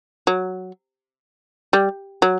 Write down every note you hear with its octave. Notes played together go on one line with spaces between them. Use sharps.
F#3
G3
F#3